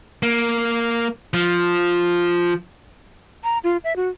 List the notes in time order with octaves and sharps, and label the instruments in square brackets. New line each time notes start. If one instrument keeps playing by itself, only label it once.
[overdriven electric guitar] A#3
F3
[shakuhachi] A#5
F4
E5
F#4